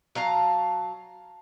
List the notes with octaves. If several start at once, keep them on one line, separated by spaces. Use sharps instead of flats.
F#3 F5 A5 A#5